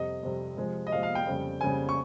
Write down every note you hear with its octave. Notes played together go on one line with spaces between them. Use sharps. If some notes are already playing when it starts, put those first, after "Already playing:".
Already playing: F2 C3 G3 D#5
F2 C3 G3
C3 F3 G#3
D#5
C3 F3 G#3 F5
F5
G5
F2 C#3 G3
F2 C#3 G3 G#5
C#6